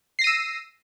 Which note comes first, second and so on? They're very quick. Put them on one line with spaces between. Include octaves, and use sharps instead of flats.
C7 A#6 D#7 E6